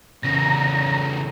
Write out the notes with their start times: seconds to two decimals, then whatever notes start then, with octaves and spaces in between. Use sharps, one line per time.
0.23 C#3 E3 A#5